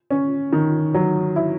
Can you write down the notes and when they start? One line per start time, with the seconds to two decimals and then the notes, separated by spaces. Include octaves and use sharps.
0.11 C#4
0.53 D#3
0.94 F#3
1.36 E4